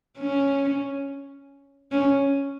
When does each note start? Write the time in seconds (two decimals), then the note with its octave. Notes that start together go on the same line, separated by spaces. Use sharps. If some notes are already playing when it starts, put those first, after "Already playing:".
0.18 C#4
1.92 C#4